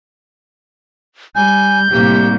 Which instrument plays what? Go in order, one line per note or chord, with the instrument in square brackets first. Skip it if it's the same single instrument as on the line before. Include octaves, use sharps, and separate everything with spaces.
[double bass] G3 [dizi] G#5 [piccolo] G6
[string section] C2 [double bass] A2 A#3 [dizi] G4